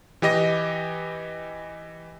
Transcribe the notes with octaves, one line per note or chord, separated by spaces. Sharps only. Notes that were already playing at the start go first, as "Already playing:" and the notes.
E3 G4 D#5 A#6